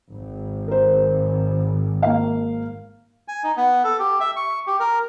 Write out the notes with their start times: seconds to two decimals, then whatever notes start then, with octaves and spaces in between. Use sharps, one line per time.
0.12 G#1
0.68 A#4 C5
2.02 A#3 F5
3.28 G#5
3.44 D#4
3.57 B3
3.84 A4
3.99 G4
4.20 E5
4.36 C#6
4.67 G4
4.80 A#4